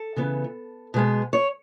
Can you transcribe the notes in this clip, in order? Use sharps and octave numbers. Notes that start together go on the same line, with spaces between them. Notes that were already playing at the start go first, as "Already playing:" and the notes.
Already playing: A4
C#3 E3 B3
B2 G#3 B3
C#5